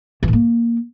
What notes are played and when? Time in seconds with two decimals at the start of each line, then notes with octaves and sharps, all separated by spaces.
0.23 E3
0.28 A2
0.33 A#3